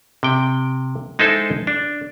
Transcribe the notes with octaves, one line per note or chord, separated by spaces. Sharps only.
C3 G5
G#3 D#4 E4 A4 C5
D4